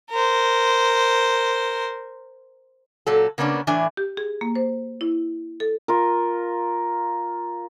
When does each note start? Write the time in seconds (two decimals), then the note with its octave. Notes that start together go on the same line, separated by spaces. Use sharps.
0.11 A#4 C5
3.07 A#2 F#3 A4
3.38 C#3 A#3 B3 C#4 D4
3.67 A2 E3 D4 G#5
3.97 G4
4.17 G#4
4.41 A#3
4.56 C5
5.01 E4
5.60 A4
5.88 F4 A#4